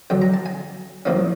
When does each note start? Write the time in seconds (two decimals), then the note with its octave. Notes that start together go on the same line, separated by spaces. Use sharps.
0.10 F#2 D3 F#3 G5
0.22 A#5
0.34 A5
0.46 G#5
1.05 C2 A#2 F3 A#3 C#4